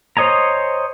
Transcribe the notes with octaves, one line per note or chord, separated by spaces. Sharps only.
C5 C#5 D#5 G#5 A#5